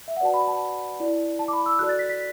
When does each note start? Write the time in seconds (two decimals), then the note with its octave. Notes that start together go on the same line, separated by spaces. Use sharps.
0.08 E5
0.17 F#5
0.21 F#4 B4 D5 A5
0.34 B5
0.47 A5
1.00 E4 D5
1.39 A5
1.48 D6
1.53 B5
1.66 E6
1.79 F#4 A4 D5 F#6
1.89 A6
1.99 B6
2.09 B6